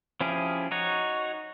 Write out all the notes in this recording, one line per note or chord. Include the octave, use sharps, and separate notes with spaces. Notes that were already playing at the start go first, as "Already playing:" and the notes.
F3 C#4 E4 G4 G#4
D#4 F#4 C#5